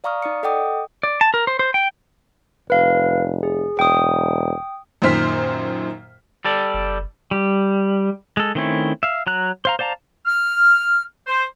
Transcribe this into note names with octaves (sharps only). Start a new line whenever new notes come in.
D5 F5 A#5 C#6 D#6 F6
D#4 D5 D#6 C#7
A4 D#5 F#5 G5 D6 D#6
D5
A5
A#4
C5
C5
G5
F1 B4 F5
G#4
E1 G5 D#6
F#2 A#2 D#3 C5 F6 B6
G3 A4 D5
F#1
G3
G#3 A4
D#3 A3 C4 C#4 E4
E5 F5
F#3 A#5 F#6
C5 F5 A#5
C5 D5 F5 A5 A#5
F6
C5